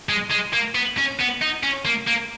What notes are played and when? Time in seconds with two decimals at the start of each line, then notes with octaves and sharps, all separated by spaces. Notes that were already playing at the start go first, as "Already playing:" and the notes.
0.09 G#3
0.31 G#3
0.53 A#3
0.75 B3
0.98 C#4
1.20 B3
1.41 D#4
1.63 C#4
1.86 A#3
2.07 A#3